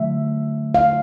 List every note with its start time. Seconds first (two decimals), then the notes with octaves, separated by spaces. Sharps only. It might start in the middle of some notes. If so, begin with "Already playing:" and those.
Already playing: D3 F#3 A3 E5
0.75 F5